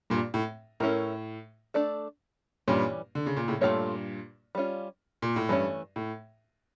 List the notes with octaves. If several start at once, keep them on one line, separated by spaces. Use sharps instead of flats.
G2 A#2
A2
A2 C#4 E4 A#4
A3 D4 A4 D5
G2 A#2 E3 G3 C#4
D3
C#3
A#2
A2 C#3
G2 A#2 A3 C#4 F4 A4 C#5
G3 C#4 F4
A#2
A2
G2 E3 A3 C#4
A2